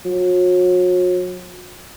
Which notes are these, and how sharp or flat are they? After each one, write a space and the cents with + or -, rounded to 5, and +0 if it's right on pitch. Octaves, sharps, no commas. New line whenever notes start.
F#3 -40